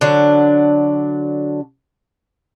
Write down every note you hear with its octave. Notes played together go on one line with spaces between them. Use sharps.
D3 F#3 D4